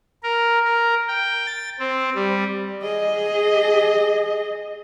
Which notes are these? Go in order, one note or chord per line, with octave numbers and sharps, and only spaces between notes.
A#4
A#4
G5
A6
C4
G3
G#4 D#5